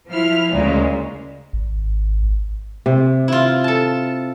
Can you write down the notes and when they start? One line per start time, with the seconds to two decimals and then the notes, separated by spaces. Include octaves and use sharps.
0.10 F3 E4 F6
0.51 D2 A#2 C#3 G#3
1.53 G#1
2.86 C3
3.28 E4 F4
3.64 A4 A5